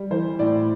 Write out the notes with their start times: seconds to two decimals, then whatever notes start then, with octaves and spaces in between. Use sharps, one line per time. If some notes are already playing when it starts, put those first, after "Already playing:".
Already playing: G3
0.11 E3 C5
0.39 A2 D5